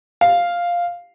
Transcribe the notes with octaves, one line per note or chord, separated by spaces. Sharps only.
F5